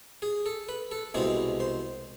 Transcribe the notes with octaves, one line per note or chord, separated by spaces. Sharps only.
G#4
A4
B4
A4
C2 B2 G#3 C4 G#4
C5